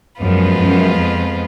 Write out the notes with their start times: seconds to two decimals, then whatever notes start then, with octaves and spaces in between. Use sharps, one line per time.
0.21 F#2 F3 G#3 B3 F4 B4
0.58 F#2
0.96 F2